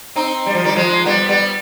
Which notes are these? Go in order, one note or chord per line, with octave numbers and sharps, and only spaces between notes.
C4 D#4
G3
F3
D#3 G3
F3 G#3
G3 B3
G3 B3